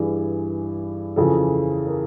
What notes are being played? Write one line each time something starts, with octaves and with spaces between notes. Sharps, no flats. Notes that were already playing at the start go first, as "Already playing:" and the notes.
Already playing: G2 E3 G#4
F2 C#3 E3 A4
A#4